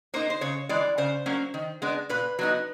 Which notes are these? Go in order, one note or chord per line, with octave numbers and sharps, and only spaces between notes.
A#3 D#4 C5
C5
C#3 C#5
E3 G#3 D5
C#3 C5
F#3 A#3 C#4
D#3
G#3 B3 D4
A#2 B4
F#3 B3 D#4